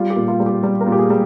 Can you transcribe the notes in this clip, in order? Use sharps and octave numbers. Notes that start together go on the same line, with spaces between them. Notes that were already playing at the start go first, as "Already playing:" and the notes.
Already playing: G3 F4
G4
A#2
F4
G3
G4
G3
A#4
A#2
G4
G#4
G3